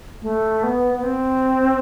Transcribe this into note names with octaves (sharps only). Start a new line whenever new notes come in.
A3
B3
B3
C4